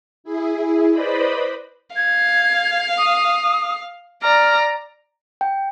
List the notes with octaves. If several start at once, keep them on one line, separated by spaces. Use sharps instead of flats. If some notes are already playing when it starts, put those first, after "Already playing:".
E4 G#4
B4 C5 D5 D#5 B5
F5 G#6
D#6
D5 A#5 F6
G5